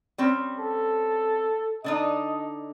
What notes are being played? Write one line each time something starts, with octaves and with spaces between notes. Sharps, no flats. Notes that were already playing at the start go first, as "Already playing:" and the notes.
G3 C4 C#4
A4
D3 D4 D#4 D#5